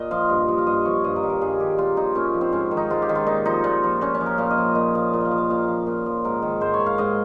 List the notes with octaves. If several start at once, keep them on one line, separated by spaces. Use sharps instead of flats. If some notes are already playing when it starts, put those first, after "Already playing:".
Already playing: A#2 D#5
F3 F5
G2
F3
F5
G2 D#5
F3 C#5
G2 D#5
A#4
D#3
A#4
G2 G#4
D#3 G4
A#2 F4
F3 D#4
A#2 C#4
F3
C4
G#2 C#4
D#3
D#4
G#2 F4
G4
D#3
F4
A#2 D#4
F3 D#4
A#2
F3
A#2 C#4
C#4
F3
A#4
A#2 F5
D#5
F3
A#2 D#5
F3 F5
A#2
D#5 F5
F3
F5
A#2 F5
F3
A#2
F3
G#2 A#4
D#3
G#2 C5
C#5
D#3
F5
G#2 D#5